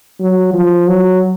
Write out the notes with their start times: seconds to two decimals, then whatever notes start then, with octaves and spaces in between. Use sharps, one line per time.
0.20 F#3
0.54 F3
0.88 F#3